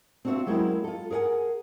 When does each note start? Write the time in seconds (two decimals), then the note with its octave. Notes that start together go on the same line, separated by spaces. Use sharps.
0.25 C4 D4 F4 F#4 E5
0.46 F#3 G#3 A#3 C4 C#4 E4
0.84 F4 A4
1.10 G#4 A#4 D5 F#5 G#5